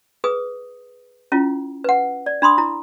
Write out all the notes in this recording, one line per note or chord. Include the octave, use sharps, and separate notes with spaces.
G#4 B4 D#6
C#4 E4 F4
B4 F#5
D5
D4 B5 C6 D#6
E4 A#5